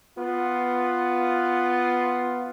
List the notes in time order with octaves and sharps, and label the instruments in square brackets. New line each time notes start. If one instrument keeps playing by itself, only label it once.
[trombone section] B3 F4